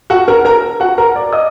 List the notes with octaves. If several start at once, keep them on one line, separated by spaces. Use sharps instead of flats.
F#4 F#5
A#4 A#5
A#4 A#5
F#4 F#5
A#4 A#5
D5 D6
D#5 D#6